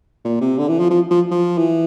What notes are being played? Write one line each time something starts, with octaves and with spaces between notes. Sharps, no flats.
A#2
C3
D3
E3
F3
F3
F3
F3
E3